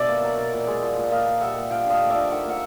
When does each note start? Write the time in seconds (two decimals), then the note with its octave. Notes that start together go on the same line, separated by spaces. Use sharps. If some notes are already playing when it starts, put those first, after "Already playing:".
Already playing: B2 D5 E5
0.08 A#3
0.22 F#3
0.37 B2
0.52 A#2
0.67 G#3
0.82 F3
0.97 A#2
1.11 A#2 D#5 F5
1.26 A#3
1.41 G3 E5 F#5
1.56 A#2
1.71 F3 F5 G5
1.86 D4 D#5 F5
2.00 A3
2.10 F3 D5 E5
2.30 D#3 E5 F#5
2.45 A#3 E5 F#5